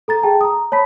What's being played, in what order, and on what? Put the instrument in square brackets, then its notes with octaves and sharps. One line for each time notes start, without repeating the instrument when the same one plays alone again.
[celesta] A4 A#5 A6
G#4 G5 A5
A#5 D#6
C#5 A5 B5 B6